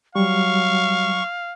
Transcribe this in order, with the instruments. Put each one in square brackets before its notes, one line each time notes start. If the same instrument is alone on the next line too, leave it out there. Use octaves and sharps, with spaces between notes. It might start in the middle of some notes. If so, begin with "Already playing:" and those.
[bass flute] F#3 [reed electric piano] G3 [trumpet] F5 [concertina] C#6